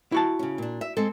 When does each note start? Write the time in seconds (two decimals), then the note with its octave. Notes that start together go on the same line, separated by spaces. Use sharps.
0.12 E4 F#4 A5
0.39 C#3 C#4
0.58 A#2 D4
0.81 E5
0.97 G#3 C4 A4